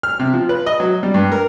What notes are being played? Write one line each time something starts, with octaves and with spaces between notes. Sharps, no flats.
F6
C3
F3
B4
D#5
F#3
G3
G2
A#4